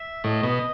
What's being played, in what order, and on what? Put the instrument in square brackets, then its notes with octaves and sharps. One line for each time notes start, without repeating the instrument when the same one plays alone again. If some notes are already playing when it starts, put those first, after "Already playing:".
Already playing: [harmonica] E5
[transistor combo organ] A2 [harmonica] D#5
[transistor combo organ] B2